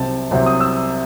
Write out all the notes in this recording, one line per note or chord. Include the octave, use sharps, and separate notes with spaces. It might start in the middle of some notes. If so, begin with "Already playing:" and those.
Already playing: C2 C3 F#3 C4 D#4 A5
C2 C3 F#3 C4
D#6
E6